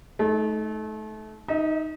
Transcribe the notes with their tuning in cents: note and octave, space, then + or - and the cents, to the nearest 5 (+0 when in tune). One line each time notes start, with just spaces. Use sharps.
A3 -30 D#4 +15
D#4 +0 E5 -40